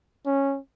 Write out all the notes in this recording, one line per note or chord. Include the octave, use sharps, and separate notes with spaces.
C#4